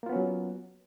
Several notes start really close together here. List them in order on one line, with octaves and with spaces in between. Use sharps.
A#3 F4 B3 C#4 F#3